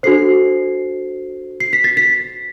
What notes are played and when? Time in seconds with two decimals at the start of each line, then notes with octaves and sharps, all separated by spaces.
0.03 D4 F#4 A4 C5 C7
1.60 C7
1.73 B6
1.84 A6
1.97 B6